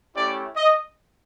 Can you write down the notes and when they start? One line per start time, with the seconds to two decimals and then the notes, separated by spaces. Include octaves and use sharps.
0.15 A3 C#4 E4 G4 D5
0.56 D#5